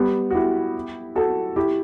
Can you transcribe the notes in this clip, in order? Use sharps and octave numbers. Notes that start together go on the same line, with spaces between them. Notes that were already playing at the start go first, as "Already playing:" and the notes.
Already playing: G3 B3
F#4
E4 G4
F#4 A4
E4 G4